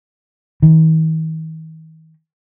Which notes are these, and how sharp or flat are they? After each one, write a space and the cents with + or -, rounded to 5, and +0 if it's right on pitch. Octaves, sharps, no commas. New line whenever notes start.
D#3 +45